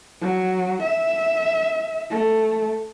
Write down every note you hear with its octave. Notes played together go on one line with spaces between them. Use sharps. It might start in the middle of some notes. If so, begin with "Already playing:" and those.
F#3
E5
A3